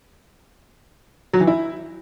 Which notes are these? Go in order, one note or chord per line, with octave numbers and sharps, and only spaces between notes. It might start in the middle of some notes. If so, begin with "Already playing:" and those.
F#3
E3
E4